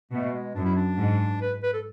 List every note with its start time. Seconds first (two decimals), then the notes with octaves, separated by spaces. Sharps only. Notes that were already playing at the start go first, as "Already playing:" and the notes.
0.11 B2 A3
0.33 G#3
0.55 F#2 D4
0.65 E4
0.76 D4
0.98 G#2
1.41 B4
1.63 B4
1.73 A4